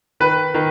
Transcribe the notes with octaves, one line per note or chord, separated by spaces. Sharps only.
D#3 B4
D#3